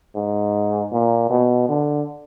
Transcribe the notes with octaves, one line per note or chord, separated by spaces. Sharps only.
G#2
A#2
B2
D3